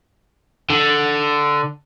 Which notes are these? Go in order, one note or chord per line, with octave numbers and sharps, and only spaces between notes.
D3